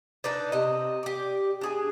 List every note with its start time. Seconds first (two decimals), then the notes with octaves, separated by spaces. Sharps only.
0.24 D4 D#4 B4 D5
0.52 C3 D#5
1.03 G4 D5
1.61 D4 G#4 G#5